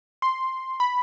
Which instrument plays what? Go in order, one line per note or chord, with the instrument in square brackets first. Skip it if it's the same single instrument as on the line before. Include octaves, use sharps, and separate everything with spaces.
[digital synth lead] C6
B5